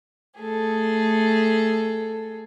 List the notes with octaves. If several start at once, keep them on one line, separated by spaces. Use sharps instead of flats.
A3 G#4 A4